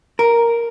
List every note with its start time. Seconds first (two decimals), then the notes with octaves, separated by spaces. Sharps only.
0.19 A#4